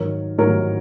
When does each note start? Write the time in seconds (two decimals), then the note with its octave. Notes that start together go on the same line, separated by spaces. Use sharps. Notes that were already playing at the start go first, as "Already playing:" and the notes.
Already playing: G#2 D#3 F#3 A#4 C#5
0.38 G#2 D#3 F#3 A#4 C#5